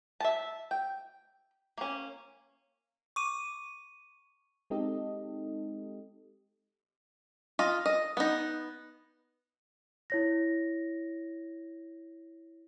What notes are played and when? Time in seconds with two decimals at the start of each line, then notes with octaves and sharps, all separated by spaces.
0.20 E5 A5
0.71 G5
1.78 A#3 C#4
3.16 C#6 D6 D#7
4.70 G#3 C4 D#4 G4 A4 D#5
7.59 F4 D#5
7.86 D#5
8.17 B3 D#4
10.10 E4 C#5 A#6